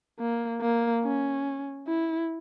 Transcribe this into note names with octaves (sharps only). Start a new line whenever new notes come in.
A#3
A#3
C#4
E4